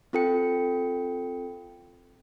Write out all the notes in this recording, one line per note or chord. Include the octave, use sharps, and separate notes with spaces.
C4 F4 A4 G5 C#7